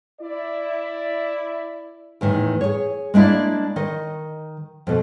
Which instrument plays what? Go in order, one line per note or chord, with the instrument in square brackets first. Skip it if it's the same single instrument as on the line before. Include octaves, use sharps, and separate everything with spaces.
[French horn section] E4 D5
[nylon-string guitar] E2 A2 D#3
G#4 C#5
G#3 A#3 D4 E4 D5
D#3 D#5
F2 B2